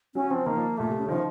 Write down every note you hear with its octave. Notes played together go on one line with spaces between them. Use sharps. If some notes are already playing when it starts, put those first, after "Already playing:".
F#3 C#4
F3 C4
D#3 A#3
F3
A#2 A3
C3
C#3
D#3 F3